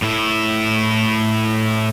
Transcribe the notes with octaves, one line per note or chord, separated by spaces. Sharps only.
A2 E4